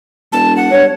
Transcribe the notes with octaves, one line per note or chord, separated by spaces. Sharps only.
E1 A5
F#5
G2 C#5